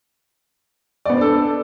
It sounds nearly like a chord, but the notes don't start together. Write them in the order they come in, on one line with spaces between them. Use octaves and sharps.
D5 B3 C5 D4 A4